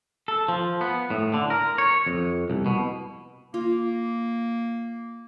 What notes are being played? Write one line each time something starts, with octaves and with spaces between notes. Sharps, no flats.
A4
F3
B3
A2
D3
A#4
C#5
F2
C2
B2
A#3 F4